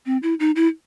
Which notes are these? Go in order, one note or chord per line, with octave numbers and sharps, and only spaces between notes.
C4
E4
D#4
E4